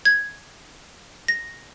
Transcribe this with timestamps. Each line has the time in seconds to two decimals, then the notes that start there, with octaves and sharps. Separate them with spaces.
0.05 G#6
1.28 A#6